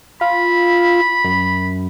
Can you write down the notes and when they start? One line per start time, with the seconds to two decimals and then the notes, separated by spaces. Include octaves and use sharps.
0.21 F4 B5
1.24 F#2